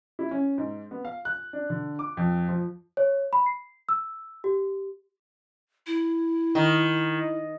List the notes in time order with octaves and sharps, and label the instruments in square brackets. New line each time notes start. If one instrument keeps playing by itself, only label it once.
[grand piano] E4
C#4
G#2
B3
F5
F#6
D4
D3
D6
F2
F3
[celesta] C#5
B5
C7
E6
G4
[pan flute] E4
[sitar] D#3